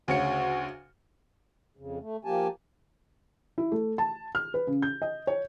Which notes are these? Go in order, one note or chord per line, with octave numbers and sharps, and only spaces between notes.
D2 C#3 F#4 C#7
F2 C#3
A3
F3 A#3 G4 G#5 A5
E4
A3
A5
F6
B4
C#3
G6
D#5
C#5